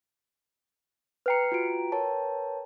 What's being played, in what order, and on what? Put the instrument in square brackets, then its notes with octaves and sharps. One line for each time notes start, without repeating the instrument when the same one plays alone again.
[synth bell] B4 G5 A#5 [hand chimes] F6 C7 C#7
[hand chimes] F4 F#4 D7
A#4 C#5 A5